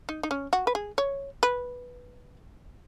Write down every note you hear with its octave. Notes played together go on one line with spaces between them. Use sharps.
D#4
D#4
C#4
F#4
B4
G#4
C#5
B4